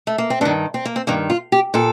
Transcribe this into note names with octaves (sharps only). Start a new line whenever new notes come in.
A3
A#3
C4
G2 D#3 D4
C4
A#3
C4
G2 D#3 A#3
F4
G4
A#2 A4